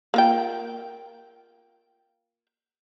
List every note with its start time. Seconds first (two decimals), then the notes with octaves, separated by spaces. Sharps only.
0.14 A#3 F4 G5